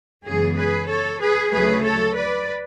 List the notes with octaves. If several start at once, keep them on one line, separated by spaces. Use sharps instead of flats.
F#2 C#3 E3 G#3 B3 G#4
G#4 B4
A4 C#5
G#4 B4
D2 C#3 F#3 A3 G#4 B4
A4 C#5
B4 D5